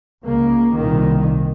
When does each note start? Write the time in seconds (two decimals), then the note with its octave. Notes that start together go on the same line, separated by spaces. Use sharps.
0.24 C#2 C#3 A#3
0.77 C2 A#2 D#3